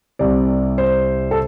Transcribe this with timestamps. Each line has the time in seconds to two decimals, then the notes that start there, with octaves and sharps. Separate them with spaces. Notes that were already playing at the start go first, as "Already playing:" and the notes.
0.19 C2 C3 G3 D5
0.78 C5
1.31 A4